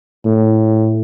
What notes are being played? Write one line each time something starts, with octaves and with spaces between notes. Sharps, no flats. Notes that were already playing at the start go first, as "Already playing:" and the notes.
A2